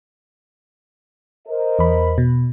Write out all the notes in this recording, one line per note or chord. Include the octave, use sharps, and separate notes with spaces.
A#4 C5 D#5
E2 B5
B2